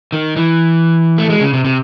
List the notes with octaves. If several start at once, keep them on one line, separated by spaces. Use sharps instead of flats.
D#3
E3
A3
G#3
C#3
C3
C3